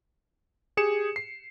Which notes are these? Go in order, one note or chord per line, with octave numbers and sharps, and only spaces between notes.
G4 G#4 C#7 E7
C7